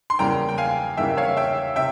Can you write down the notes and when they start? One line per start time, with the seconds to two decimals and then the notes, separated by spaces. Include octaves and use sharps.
0.10 C6
0.19 E2 C#3 E3 G3 A#3 G5 A#5
0.49 G5
0.58 F5 G#5
0.97 E2 C#3 E3 G3 A#3 E5 G5
1.17 C#5 F5
1.37 E5 G5
1.76 C3 E5 G5